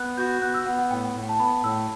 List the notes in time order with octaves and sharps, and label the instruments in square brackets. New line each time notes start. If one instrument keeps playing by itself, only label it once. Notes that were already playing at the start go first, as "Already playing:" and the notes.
Already playing: [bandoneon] B3 [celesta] F#6
[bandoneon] F#4 [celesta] G6
[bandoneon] B3 [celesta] F#6
[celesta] E6
[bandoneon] B3 [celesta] F#5
[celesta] F#5
[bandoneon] A2 [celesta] G5
[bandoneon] A2
[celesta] A5
[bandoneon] B3 [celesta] B5
[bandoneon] A2 [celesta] E6